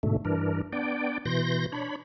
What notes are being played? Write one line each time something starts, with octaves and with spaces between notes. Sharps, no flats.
G#2 B2 D3 A3
G2 E3 D4 A#4
B3 D4 D5 G5
B2 E3 C6 G6 A#6
D4 C#5 B5